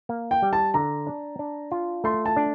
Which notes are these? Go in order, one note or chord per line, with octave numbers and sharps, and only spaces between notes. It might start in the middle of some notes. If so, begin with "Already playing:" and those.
A#3
G5
G3
A5
D3 A#5
D4
D4
F4
A3 C6
A5
D4